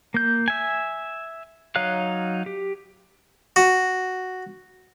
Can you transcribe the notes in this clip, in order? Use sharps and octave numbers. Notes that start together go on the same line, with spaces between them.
A#3 G6
E5 G#5
F#3 D#4 C#5 F5 F#6
G4
F#4